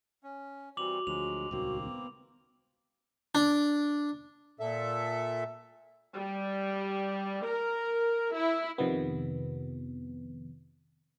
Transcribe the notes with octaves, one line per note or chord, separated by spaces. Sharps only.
C#4
E3 G3 C4 F#4 D6 F7 F#7
D2 F3 F#3 G#3 F7
D#1 C#2 D#3 A#3 C4 F#4
B3
D4
A#2 A4 E5
G3
A#4
E4
F2 C3 D#3 F3 B3